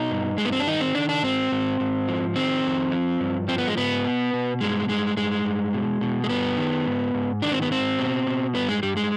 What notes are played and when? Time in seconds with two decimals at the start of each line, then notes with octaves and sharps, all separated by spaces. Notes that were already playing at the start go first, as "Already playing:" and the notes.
Already playing: B2 D#4
0.11 G2
0.38 G2 G#3
0.45 B3
0.52 C4
0.59 D4
0.67 D#3 D#4
0.81 C4
0.95 D#3 D4
1.09 D4
1.23 G#2 C4
1.51 G#2
1.80 G#2
2.08 F3
2.36 D#3 C4
2.64 F2
2.92 F3
3.20 G2
3.48 F3 C4
3.58 B3
3.68 G#3
3.77 G#2 B3
4.05 B2
4.33 B2
4.61 G2 G#3
4.89 G2 G#3
5.17 G2 G#3
5.45 G2
5.74 B2
6.01 B2
6.24 G#3
6.29 G2 B3
6.57 D#3
6.86 G#2
7.14 G#2
7.42 D#3 D4
7.52 C4
7.62 B3
7.70 G#2 C4
7.99 B2
8.27 B2
8.54 G2 B3
8.69 G#3
8.83 G2 G3
8.97 G#3